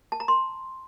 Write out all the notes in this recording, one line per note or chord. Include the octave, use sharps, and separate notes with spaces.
A5
A#5
C6